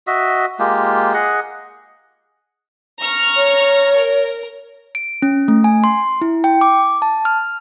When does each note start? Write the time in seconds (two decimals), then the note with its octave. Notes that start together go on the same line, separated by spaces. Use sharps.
0.07 F#4 D#5 E5
0.59 G#3 A#3 F4 G4
1.14 G#4 D#5 F#5
3.00 A#5 C#6 F6
3.36 C#5
3.98 A#4
4.95 D7
5.22 C#4
5.48 A3
5.64 G#5
5.84 C6
6.21 E4
6.44 G5
6.61 D6
7.02 A5
7.25 F6